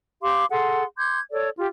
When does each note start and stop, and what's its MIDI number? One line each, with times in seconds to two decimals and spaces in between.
0.22 0.45 67
0.22 0.45 77
0.22 0.45 84
0.22 0.45 86
0.50 0.84 68
0.50 0.84 69
0.50 0.84 78
0.50 0.84 84
0.97 1.18 84
0.97 1.18 86
0.97 1.18 91
0.97 1.18 92
1.31 1.49 69
1.31 1.49 73
1.31 1.49 74
1.58 1.66 65
1.58 1.66 67